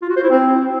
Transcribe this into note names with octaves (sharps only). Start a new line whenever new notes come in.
F4
F#4
C5
E4
C4